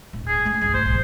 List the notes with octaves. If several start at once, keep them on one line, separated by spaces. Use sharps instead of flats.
D1
G#4
A3 C#4
G1 C2 G#4
C5
A#1 D#2